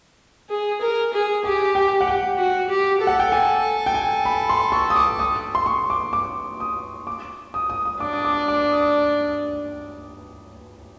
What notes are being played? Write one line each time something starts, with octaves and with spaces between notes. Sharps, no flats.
G#4
A#4
G#4
G4 G#5
G5
F#5
G5
F#4
G4
A4
F#5
G5
A4 G#5
G5
G#5
B5
C6
C#6
D#6
D6
D#6
C6
C#6
D6
D6
D#6
D6
D#6
D#6
D#6
D4 D6
D#6
D6
D6
D#6